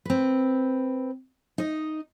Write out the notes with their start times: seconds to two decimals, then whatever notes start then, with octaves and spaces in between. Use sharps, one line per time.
0.05 C4 B4
1.58 D#4 D#5